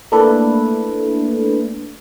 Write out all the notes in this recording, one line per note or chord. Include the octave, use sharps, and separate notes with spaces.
A3 A#3 D4 E4 A4 B4